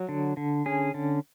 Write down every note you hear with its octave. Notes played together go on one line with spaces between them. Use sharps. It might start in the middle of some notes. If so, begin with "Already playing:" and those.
Already playing: F#3
D3
D3
C#4 G#4
D3